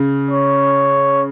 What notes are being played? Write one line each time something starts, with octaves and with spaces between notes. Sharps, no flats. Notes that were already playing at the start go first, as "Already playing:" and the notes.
Already playing: C#3
C#5